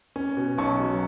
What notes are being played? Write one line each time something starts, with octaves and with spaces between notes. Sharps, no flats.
C#4
B2
B1 A5 C#6
F#3